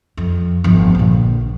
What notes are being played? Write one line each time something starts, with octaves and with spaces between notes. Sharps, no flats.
F2
G1 F3
A#1 D3